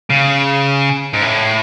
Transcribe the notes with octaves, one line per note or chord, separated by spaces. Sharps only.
C#3
G#2
A2